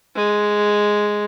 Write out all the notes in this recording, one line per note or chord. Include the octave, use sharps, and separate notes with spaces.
G#3